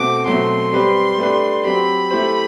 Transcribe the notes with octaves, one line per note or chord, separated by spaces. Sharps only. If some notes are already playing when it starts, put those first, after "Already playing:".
Already playing: B2 A3 C4 F#4 D6
B2 F#3 A3 C4 C6
G3 C4 G4 B4
A3 D4 G4 B4
F#3 C4 G4 B5
A3 E4 G4 C5